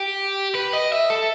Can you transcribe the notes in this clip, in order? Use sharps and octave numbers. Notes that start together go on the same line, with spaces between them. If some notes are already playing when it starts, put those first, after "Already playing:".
Already playing: G4
B4
D#5
E5
A4